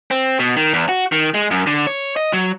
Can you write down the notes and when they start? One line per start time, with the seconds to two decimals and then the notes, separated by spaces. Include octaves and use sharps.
0.11 C4
0.39 B2
0.57 D#3
0.73 E2
0.89 F#4
1.12 D#3
1.34 G#3
1.51 F#2
1.67 D3
1.87 C#5
2.17 D#5
2.33 F#3